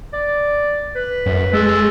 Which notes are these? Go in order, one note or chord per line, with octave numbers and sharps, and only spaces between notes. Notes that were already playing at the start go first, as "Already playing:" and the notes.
D5
B4
F#2
G#3 A4